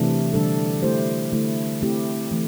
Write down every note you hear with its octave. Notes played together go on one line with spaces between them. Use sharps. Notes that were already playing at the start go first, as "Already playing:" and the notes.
Already playing: C3 E3 A3 D4
D3 G3 D4 A4
A3 E4 G4 C5
D3 A3 E4
A3 C4 E4 G4
E3 A3